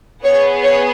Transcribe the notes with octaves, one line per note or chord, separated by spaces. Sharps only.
B3 G#4 C#5
C#5